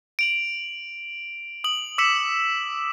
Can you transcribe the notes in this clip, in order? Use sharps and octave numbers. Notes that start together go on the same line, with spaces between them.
D7 F7 F#7
D#6 F#7
D6 E6 B6 C#7 E7